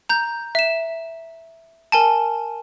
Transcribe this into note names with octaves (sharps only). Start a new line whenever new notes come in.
A#5 G6
E5 E7
A#4 G#5 A5